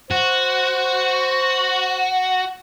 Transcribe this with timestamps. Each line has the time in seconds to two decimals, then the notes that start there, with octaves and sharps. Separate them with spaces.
0.11 F#4 C5